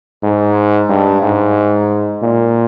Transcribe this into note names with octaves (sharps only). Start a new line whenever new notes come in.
G#2
G2
G#2
A#2